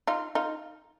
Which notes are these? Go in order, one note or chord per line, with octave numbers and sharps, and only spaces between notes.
D#4 F4
D#4 F4